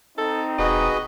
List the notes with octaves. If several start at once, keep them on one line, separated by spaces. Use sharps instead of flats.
C4 D#4 A4
E1 F#4 G#4 B4 D#5